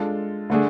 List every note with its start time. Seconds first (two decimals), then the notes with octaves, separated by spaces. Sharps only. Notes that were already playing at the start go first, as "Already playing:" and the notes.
Already playing: G#3 D4 F4 A4
0.50 D3 A3 D4 G#4